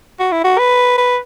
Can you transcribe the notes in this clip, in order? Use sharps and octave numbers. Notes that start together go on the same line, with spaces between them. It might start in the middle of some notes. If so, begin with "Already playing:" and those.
F#4
E4
F#4
B4
B4